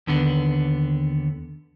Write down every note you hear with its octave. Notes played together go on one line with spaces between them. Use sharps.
D#2 D3 B3